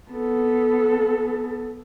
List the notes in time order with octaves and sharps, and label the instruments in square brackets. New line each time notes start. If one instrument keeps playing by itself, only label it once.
[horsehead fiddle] B3 A4